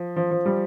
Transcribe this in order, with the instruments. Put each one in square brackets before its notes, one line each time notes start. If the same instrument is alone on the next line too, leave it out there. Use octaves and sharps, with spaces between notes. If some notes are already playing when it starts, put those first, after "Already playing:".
Already playing: [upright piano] F3
F3
F3
G3